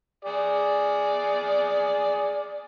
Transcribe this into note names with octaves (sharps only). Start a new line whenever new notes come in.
G#4 D5